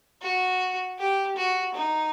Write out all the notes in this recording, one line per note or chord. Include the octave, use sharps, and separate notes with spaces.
F#4
G4
F#4
D#4